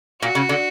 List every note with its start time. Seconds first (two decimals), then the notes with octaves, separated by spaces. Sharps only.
0.22 A#2 F#4
0.35 C#3
0.49 D3